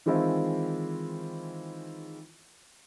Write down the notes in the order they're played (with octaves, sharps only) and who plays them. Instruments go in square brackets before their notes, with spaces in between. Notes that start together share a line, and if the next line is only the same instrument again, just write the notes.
[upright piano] D#3 E3 G#3 C4 E4 F4